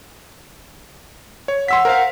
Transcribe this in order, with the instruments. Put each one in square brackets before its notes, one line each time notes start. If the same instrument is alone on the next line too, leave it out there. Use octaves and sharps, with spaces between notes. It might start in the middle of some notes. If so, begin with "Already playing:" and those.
[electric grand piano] C#5
[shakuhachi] F#5 [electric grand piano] C6 E6 B6
[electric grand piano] A#4 C5 F5